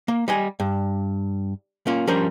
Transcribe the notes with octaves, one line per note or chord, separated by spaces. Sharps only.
A#3
G3 D#5 G#5
G2
A#3 C#4 F4
F3 G3 C#4 D4 A#4 C5